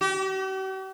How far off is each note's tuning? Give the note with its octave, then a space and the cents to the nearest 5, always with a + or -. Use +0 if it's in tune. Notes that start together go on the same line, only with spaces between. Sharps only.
G4 -45